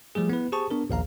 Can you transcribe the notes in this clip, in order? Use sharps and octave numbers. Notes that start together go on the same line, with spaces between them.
F3 G3 A3 G#4
B3 E4 B4
G4 G#4 C5 A5 C#6 D#6
B3 D4 A#4
A#1 D#2 F5 A#5